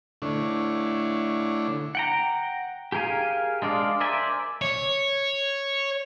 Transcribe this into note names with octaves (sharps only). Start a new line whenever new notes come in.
D3 A3 D4 E4 C#5
F#5 G5 A#5
G4 G#4 A#4 F5 G#5
G#3 D4 D5 F5
A#4 C5 D5 E5 G#5
C#5